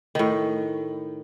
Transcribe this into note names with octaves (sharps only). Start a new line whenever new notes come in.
A2 D#3